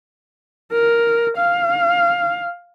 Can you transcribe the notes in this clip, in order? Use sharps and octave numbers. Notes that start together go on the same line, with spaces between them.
A#4
F5